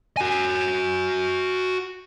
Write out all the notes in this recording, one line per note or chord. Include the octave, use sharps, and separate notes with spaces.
F#4 G#5